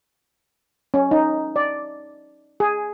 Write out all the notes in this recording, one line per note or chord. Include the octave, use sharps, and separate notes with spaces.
C#4
D#4
D5
G#4